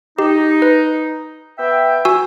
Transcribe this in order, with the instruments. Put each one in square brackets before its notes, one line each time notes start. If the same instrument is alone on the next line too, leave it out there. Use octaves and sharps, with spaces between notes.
[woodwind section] D#4 [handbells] G4
[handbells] B4
[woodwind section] B3 E5 G5
[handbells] F#4 G#5 E6